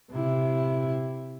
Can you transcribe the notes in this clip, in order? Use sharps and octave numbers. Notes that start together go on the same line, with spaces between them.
C3 E4